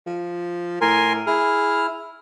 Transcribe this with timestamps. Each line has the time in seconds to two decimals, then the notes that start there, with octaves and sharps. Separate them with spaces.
0.06 F3
0.81 A2 A#4 G#5 C6
1.27 E4 G#4 F6